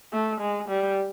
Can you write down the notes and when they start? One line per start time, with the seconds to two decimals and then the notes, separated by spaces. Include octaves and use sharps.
0.13 A3
0.41 G#3
0.69 G3